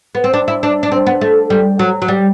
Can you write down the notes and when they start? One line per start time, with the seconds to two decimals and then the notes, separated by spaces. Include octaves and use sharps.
0.15 B3
0.24 C4
0.34 D4
0.48 E4
0.63 D4
0.83 D4
0.92 C4
1.07 B3
1.21 A3
1.50 G3
1.79 F#3
2.02 F#3
2.08 G3